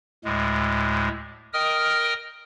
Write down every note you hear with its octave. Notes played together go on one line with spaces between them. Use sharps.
D2 A2 G#3
A#4 D#5 G5 D#6 F6